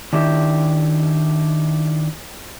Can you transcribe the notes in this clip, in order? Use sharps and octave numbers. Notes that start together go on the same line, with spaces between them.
D#3 D4 E4 G4